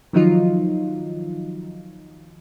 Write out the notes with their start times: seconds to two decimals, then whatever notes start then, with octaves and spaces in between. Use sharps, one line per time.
0.13 D#3 F3 F#3 D#4 F4